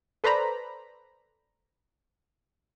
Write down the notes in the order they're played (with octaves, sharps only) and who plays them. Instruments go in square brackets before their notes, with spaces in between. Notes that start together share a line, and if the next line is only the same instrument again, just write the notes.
[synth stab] A4 B4 C5 D5 A#5 B5